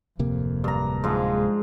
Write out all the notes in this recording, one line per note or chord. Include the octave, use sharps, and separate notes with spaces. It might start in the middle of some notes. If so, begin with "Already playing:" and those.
D1 F2 C3 A#3
G2 A#5
G#2 F3 G#3